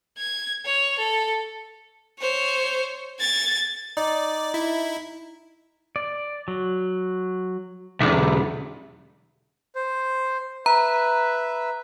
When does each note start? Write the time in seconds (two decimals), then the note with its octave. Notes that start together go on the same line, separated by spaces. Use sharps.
0.18 G#6
0.65 C#5
0.99 A4
2.19 C5 C#5
3.19 G#6 A6
3.97 D#4 D5
4.54 E4
5.96 D5
6.48 F#3
8.01 B1 E2 E5 D6
9.76 C5
10.66 B4 E5 A#5